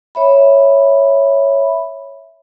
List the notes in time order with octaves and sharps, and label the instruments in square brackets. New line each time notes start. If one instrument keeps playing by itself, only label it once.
[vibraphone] C#5 E5 B5